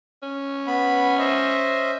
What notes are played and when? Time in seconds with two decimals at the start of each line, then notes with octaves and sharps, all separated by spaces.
0.23 C#4
0.67 B3 B5
1.19 C5 D#5 E5